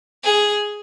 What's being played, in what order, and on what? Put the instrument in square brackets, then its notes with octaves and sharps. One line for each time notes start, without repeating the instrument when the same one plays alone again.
[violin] G#4